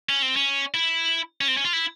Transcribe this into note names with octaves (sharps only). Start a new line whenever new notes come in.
C#4
C4
C#4
E4
C#4
C4
C#4
F4
E4